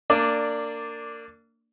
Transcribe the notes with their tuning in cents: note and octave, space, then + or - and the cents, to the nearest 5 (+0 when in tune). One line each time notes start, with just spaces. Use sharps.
A#3 -25 D4 +0 D5 -5